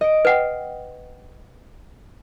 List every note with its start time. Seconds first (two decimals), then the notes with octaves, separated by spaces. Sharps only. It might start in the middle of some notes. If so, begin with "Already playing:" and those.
0.01 D#5 D7
0.25 B4 F#5 G5